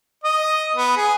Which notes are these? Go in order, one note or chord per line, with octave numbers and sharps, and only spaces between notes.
D#5
B3
G#4